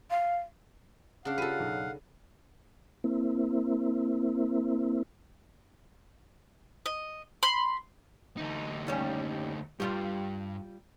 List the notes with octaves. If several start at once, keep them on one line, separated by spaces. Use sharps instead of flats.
F5
C#3 D4 F5 F#5
F4 G4 A4 B4 D#7
B1
A#3 C4 E4
D#5
B5 C6
D2 D#4
D#2 G3 C#4
G2 G3 F4 G4